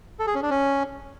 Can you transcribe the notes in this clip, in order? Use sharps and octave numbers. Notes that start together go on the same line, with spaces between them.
A4
G#4
C#4
D4
C#4